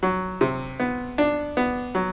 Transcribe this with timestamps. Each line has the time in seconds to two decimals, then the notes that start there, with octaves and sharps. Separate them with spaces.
0.03 F#3
0.41 C3
0.80 B3
1.18 D4
1.57 B3
1.95 F#3